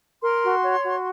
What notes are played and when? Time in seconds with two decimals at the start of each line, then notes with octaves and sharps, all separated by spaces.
0.21 A#4 C6
0.43 F#4
0.63 C#5
0.84 F#4